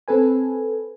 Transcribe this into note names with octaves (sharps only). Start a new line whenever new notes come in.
C4 A4 B4 G#5